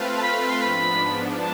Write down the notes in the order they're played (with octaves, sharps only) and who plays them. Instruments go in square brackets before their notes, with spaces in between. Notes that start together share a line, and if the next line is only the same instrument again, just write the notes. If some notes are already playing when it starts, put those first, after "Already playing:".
Already playing: [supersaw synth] A3 C4 F4 B4 F5
[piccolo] A5
B5
C6
[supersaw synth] G#2 F3 B3 D4 [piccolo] B5
[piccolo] A5